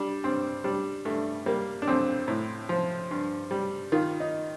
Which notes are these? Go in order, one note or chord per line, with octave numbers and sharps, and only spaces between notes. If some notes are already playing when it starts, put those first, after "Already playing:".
Already playing: G3 D4
G2 C4
G3 D4
G2 A3
G3 A#3
D4
F2 C4
A2
F3
G2
G3
D#3 F4
D#4